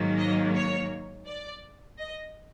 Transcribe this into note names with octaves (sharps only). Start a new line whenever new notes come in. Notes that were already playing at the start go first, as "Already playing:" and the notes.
Already playing: G#2 D#3 F#3 A#3
D#5
C#5
D5
D#5